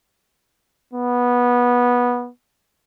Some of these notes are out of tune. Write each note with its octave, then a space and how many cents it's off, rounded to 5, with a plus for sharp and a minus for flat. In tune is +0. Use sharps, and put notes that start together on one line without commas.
B3 -15